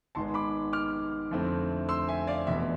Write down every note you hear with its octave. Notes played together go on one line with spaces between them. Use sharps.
G#1 G#2 G#3 B3 A5 C6
B5 D6
D6 F6
F2 D3 A3 C4 E4
C6 E6
E5 G#5
D5 F5
F1 E2 B2 E5